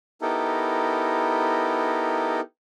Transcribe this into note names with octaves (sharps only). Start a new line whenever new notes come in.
B3 D#4 E4 G4 A4 A#4